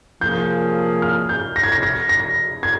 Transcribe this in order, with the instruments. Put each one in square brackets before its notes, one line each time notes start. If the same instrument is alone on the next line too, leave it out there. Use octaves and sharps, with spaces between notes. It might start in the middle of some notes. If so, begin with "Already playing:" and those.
[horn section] C3 F3 A#3 C#4 G#4 [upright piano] G6
[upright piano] F6
G6
A#6
G#6
A#6
A#6
A#6
G#6